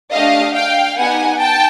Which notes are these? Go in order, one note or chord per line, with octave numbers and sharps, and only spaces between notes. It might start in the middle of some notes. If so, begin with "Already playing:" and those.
A3 D4 G4 D#5 F5
F5 G5
B3 D#4 G4 F#5 G#5
G5 A5